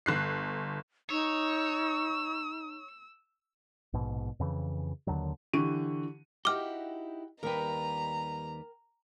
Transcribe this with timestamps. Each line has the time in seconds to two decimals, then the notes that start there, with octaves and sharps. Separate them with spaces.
0.06 G1 F#6 C7
1.10 D#4 C#5 E6
3.93 A#1 G#2 B2
4.40 F2 C#3 E3
5.07 D#2 D3 D#3 F#3
5.53 D3 E3 G4 C#6 D#7
6.45 D#4 E4 F#4 G4 G5 D6 F6
7.43 D#2 G3 A#4 B4 G5 A#5